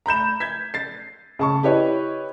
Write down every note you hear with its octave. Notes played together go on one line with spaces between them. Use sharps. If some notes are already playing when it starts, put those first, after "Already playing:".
A#5 B5 G6 E7
G6 G#6 B6
A6 C7
C#3 A5 C#6
E4 G4 B4 C#5 D#5